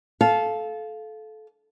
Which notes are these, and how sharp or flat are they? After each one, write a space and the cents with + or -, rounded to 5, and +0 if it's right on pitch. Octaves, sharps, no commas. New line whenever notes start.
A4 -20 F5 +0